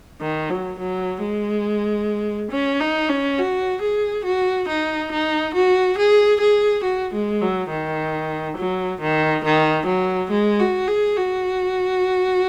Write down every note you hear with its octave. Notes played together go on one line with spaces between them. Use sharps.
D#3
F#3
F#3
G#3
C#4
D#4
C#4
F#4
G#4
F#4
D#4
D#4
F#4
G#4
G#4
F#4
G#3
F#3
D#3
F#3
D#3
D#3
F#3
G#3
F#4
G#4
F#4